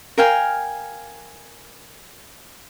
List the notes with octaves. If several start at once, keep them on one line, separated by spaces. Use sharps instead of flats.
A#4 F5 G5 G#5